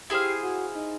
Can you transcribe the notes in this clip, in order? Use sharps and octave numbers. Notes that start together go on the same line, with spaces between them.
E4 G4 G#4 C5 F5
F#4
D#4